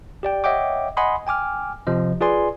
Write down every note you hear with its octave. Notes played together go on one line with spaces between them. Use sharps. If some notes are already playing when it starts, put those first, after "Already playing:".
G4 D5 G5
C#5 D#5 E5 F#5 G5 D6
D#5 F#5 G#5 B5 C6 D#6
G5 G#5 D6 F6
C3 F3 D#5
F4 G#4 B4 D5 G#5 C6